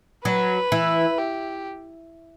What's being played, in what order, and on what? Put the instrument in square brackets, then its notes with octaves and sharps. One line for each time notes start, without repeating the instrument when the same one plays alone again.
[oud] F#3 [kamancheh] B4
[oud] E3
[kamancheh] G4